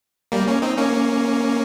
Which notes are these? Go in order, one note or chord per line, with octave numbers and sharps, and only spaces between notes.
G3 A#3
A#3 C#4
C4 D#4
A#3 C#4